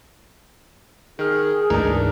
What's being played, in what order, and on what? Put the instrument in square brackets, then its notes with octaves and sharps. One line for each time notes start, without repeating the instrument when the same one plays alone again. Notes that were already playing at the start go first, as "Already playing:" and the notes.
[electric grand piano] D#3 F6 [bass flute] G#4
[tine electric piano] A1 D2 G#2 [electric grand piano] E3 D4 D#4 [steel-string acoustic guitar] A#4